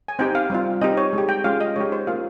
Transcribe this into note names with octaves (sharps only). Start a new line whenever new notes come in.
G#5
C4 D#4 G4 G5
F5
G3 C4 F4
C4 D#4 G4 D#5
C#5
G#3 D#4 G4
G5
G#3 C#4 F4 F5
D#5
G#3 D#4 G4 C#5
C5
A#3 C#4 F4 F5